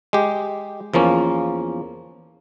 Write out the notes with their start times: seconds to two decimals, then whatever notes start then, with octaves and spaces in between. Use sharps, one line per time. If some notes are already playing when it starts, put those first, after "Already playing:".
0.13 G#3 G4
0.94 E2 F3 A#3 C#4